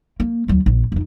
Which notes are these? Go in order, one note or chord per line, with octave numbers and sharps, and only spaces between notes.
A#3
D#2 F#3
A#1
F2 D#4